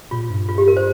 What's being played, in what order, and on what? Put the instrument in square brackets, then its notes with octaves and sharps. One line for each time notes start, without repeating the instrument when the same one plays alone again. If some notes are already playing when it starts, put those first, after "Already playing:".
[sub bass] A#2 [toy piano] F4
[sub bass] G2
[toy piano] F4
G4
A#4
C5